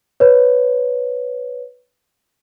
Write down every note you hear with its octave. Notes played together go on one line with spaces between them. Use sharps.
B4 C#5